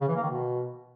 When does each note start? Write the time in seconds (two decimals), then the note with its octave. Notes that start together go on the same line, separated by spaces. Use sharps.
0.01 C#3
0.08 E3
0.15 A#3
0.23 D#3
0.30 B2